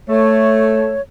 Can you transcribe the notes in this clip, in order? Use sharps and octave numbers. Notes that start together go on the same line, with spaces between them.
A3 C#5